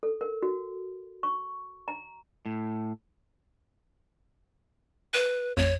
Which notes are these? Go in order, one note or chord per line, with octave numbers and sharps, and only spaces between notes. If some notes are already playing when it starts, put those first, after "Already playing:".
A4
A#4
F#4
C#6
A#5
A2
B4
A1 F2 C#5